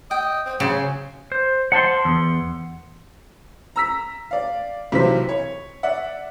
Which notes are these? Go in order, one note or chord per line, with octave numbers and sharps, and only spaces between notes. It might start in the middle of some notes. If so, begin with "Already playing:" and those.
D#5 G5
C4
C#3 F#3 C5 G#5
C5
C5 F#5 A5 C6
E2
A#5 E6 B6
D5 F5
B1 C3 E3 F#4 C5 B6
C#5
D5 E5 F#5